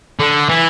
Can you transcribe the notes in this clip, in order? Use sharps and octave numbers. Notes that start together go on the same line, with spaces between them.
D3
E3